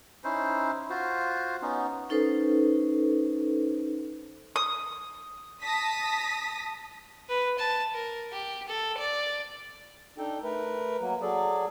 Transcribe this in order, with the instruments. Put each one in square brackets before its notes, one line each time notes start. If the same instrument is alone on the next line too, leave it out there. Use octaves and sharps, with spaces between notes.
[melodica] C#4 D#4 E4 C5
F4 F#4 C5
B3 C#4 D#4
[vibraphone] C#4 D#4 A4 B4 C5
[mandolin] D#6
[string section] A5 D#6 A#6 B6
[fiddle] B4
A5
A#4
G4
A4
D5
[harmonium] D4 D#4 A4 G5
A3 A#4 B4
F#3 A#3
F#3 G#4 A4 D5